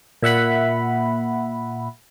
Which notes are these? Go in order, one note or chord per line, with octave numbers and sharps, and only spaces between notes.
A#2 E5 F#5 B5